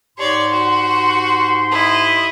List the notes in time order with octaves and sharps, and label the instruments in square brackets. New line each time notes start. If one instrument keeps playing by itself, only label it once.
[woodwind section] G#2 G4 C6 [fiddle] C#5 D5
[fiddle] F#4
E4 D#5